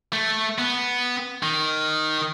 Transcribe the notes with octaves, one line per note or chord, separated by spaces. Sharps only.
A3
B3
D#3